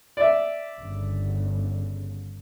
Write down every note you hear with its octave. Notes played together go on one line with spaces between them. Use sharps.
D5 E5
G1 C#3